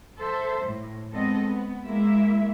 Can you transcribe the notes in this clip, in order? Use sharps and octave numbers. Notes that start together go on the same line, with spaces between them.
A4 C5 E5
A2
G#3 B3 C4 A4 D#5
B3
G#3 A#3 E4 E5